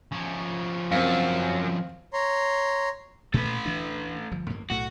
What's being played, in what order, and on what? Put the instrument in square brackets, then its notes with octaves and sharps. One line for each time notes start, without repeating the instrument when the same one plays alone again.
[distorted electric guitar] F3 C#4
[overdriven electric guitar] F#2 [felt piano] C4 F5
[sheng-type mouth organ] C#5 A#5 C6
[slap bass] A#2 [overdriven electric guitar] A3 B4
[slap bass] D2 E3 D4
G1 F3
A1 G2 A#3
[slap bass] B1 A2 A3 [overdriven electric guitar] F#4